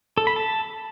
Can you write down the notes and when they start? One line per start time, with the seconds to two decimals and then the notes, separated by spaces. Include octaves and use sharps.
0.18 A4
0.27 B5
0.36 A5